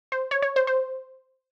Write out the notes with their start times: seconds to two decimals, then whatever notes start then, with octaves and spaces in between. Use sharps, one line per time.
0.12 C5
0.31 C#5
0.42 C#5
0.56 C5
0.67 C5